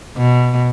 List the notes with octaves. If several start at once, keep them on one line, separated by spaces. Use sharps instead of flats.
B2